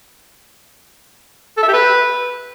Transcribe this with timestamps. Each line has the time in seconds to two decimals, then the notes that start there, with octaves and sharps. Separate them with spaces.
1.57 A4
1.62 E5
1.68 G4
1.73 B4